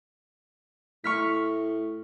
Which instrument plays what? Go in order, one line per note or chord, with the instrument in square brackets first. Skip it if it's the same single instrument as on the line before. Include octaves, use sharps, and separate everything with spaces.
[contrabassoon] A2 [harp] C#6 F6 B6